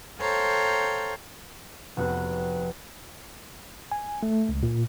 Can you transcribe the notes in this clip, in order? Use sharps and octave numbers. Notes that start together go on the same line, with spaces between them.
A4 C5 C#5 F5 G5 A#5
F1 B3 F#4 F#6
G#5
A3
C#2
A#2